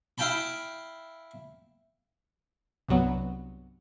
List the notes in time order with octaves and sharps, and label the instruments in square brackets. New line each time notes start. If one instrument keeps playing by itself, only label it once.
[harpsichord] E4 F5 G5 A5 B5
[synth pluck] C2 G2 F#3 B3